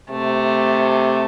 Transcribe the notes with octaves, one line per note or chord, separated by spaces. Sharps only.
C3 A3